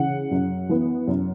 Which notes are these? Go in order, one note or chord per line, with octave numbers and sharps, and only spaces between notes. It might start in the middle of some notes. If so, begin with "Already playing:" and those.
Already playing: C#3 E3 F#5
F#2
E3 B3
F#2